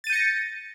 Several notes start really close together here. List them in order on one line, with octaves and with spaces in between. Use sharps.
A6 D#7 G6 C#7 A#6